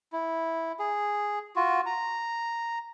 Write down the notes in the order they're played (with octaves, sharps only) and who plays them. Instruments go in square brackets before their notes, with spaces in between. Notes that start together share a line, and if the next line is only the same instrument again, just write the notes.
[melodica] E4
G#4
F4 F#4
A#5